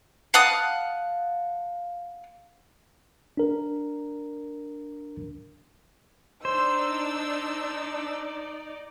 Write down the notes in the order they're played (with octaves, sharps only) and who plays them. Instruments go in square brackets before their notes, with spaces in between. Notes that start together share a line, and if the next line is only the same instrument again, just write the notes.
[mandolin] F5 F#5 A5 D#6
[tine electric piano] D4 A#4
[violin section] D4 E6 [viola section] D#4 D5 [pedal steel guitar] C5